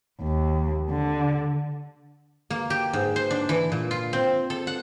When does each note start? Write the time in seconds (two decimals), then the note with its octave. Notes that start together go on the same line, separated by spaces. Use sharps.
0.21 D#2
0.90 D3
2.50 A#3
2.70 G4
2.93 G#2
3.16 C5
3.30 D4
3.49 E3
3.72 A#2
3.91 F4
4.13 C4
4.50 A4
4.67 F#5